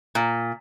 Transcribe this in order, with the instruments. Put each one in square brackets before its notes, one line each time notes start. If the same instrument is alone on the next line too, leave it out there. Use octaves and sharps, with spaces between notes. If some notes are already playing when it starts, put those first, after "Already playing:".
[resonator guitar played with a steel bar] A#2